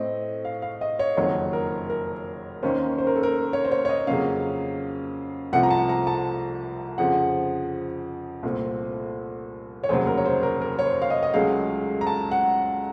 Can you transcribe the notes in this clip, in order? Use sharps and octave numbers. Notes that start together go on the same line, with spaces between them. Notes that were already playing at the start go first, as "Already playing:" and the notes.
Already playing: A2 A3 C4 D#5
F5
F5
D#5
C#5
F#1 F2 D#3 F#3 C#5
A#4
A#4
D#2 D#3 A#3 C#4 C5
C5
A#4
A4
A#4
C#5
C5
C#5
C#5
D#5
F2 C#3 F#3 A#3 C#4 F5
C2 C3 F3 A3 F#5
A#5
A5
A#5
A5
F2 C#3 F3 F#5
C2 A#2 A3 C4
C#5
F1 D#2 C#3 F#3 C5
A#4
C#5
C5
A#4
A#4
C#5
C5
F5
D#5
D#5
C#2 C#3 F#3 A3 F5
A#5
A5
F#5